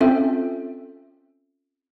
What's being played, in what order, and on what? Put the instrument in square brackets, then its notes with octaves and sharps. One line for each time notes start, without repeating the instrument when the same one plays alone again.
[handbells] C4 C#4 F4 A4 E5 G5